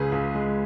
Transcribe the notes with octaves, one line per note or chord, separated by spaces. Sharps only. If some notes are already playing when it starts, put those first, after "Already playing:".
Already playing: C#2 C#3 G#4 B4
C#2
G#3